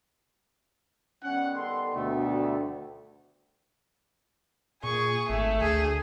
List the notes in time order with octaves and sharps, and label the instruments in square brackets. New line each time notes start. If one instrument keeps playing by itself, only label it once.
[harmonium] D#3 G3 B3 [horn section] C#4 F#5
[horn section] A4 C6
[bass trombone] D2 [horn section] B2 A3
[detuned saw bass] A#2 [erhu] G#4 [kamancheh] C#6
[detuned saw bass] G#1 [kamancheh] A3
[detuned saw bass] D2 [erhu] G#4